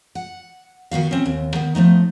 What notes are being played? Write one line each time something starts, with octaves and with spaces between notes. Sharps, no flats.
F#5
D#3 B3 F#4 F5
C4 C#4
D#2
D#3 B3
F3 F#3 A3 D#4